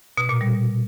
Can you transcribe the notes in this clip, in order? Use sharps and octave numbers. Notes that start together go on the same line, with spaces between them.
B2
A#2
G3